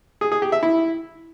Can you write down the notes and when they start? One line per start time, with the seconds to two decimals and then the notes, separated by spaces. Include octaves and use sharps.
0.21 G#4
0.32 G#4
0.42 G4
0.52 E5
0.63 E4